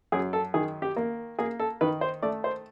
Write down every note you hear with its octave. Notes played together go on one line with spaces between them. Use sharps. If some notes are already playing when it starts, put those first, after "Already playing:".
F#2 G#4
A4
D#3 G#4
G4
A#3
A#3 G#4
A4
D#3 B4
C5
A3 D5
C5